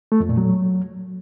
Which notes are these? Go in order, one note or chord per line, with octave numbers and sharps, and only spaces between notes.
A3
F2
A#2
F#3